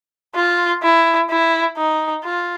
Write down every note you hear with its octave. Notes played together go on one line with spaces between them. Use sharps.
F4
E4
E4
D#4
F4